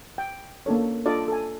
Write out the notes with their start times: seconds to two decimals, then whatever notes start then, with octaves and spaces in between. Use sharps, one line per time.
0.18 G5
0.66 A#3 C#4 D4 A4 C#5
1.06 D4 F4 A4 D5 D#5
1.28 A4 G#5